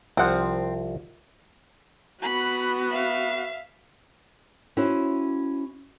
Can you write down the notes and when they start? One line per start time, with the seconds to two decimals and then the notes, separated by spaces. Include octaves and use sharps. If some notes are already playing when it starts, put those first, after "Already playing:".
0.17 C2 F3 C4 F#5
2.22 B3 F#4 B5
2.90 E5 F5
4.77 C#4 E4 F#4 C5